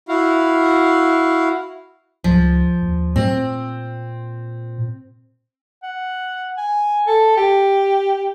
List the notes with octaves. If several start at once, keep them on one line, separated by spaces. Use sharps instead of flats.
E4 F#4 F5
C#2 F3
D#2
A#2 C4
F#5
G#5
A4
G4